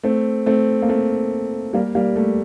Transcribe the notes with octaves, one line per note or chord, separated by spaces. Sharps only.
A3 C4
A3 C4
A#3
A3 C4
G3 A#3
G3 A#3
A3